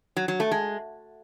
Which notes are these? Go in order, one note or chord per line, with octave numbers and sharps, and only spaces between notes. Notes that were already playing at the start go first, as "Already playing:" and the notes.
F#3
F#3
A3
G#3